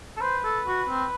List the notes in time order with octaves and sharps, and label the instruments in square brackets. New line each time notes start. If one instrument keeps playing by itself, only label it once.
[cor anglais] A4
[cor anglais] B4 [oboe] C5
[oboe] A4
F#4
C4